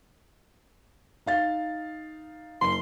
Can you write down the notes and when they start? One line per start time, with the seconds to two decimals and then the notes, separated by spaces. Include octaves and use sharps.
1.26 D#4 F5 A6
2.61 F#1 C6